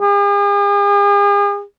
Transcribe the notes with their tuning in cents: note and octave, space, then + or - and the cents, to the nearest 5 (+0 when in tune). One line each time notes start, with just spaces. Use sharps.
G#4 -45